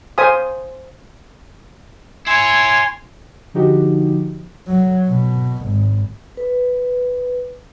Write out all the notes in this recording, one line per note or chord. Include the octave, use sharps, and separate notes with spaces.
C5 F5 G#5 D#6
E4 C#5 G#5 C6
D3 F3 D#4 F#4 G4
F#3
B2
G#1
B4